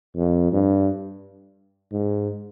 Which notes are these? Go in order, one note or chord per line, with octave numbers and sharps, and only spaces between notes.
F2
G2
G#2